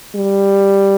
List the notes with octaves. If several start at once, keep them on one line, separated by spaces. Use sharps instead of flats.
G3